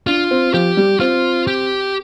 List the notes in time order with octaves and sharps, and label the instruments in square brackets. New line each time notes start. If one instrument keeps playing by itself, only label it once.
[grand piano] D4 [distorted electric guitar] F4
[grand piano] C4
[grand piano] F3 [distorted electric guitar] G4
[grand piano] G3
[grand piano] C4 [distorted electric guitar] F4
[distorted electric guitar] G4